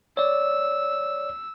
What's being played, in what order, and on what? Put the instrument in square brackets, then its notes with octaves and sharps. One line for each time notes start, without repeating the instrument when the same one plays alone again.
[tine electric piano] C#5 D5 [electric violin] E6